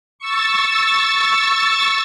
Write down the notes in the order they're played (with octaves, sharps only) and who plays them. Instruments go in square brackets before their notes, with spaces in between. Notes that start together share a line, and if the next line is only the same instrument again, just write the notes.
[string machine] C#6 E6 A6